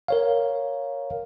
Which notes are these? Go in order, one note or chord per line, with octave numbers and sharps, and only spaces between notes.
A#4 C#5 F5